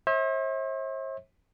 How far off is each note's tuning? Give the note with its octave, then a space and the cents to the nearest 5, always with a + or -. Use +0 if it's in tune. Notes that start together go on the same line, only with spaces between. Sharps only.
C5 +45 E5 -35